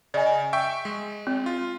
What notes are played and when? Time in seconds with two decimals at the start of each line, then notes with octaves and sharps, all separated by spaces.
0.14 C#3 D5 D#5 G#5
0.53 E5 G5 C#6
0.85 G#3
1.27 C4
1.46 F4